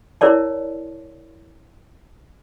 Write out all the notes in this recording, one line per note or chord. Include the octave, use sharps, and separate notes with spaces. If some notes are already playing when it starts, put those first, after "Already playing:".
E4 A#4 C#5 D5 A5